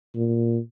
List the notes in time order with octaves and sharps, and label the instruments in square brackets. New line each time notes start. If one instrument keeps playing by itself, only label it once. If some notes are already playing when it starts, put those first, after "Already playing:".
[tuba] A#2